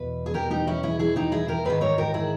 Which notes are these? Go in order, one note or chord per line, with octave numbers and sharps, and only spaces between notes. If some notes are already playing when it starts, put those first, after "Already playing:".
Already playing: E2 B2 B4
G#4
G4 A#4
D#4 G4
C#4 E4
E4 G#4
E4 G#4
D#4 G4
E4 G#4
G4 A#4
G#2 D#3 G#4 B4
A#4 C#5
G4 A#4
E4 G#4